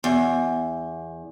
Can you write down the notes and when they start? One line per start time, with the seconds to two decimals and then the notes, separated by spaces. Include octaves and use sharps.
0.04 E2